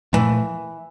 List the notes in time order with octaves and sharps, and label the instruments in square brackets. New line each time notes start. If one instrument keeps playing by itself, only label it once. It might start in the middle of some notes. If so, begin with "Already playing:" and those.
[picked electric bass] A#2 F3 A3 [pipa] E3